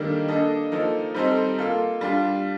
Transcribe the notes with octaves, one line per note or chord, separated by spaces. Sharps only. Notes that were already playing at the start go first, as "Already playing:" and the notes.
Already playing: D#3 G3 A#3 D4 A4
A#3 D4 A4 D#5
F3 A#3 D#4 A4
G3 C4 D#4 A4 C5
A#3 F4 A4
G3 D4 F4